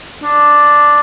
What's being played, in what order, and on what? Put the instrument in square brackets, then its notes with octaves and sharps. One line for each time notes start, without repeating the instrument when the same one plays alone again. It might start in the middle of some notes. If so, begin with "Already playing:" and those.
[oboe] D4